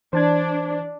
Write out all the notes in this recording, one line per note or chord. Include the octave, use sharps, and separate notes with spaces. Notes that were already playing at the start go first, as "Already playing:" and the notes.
E3 D4 C5 A5 G#6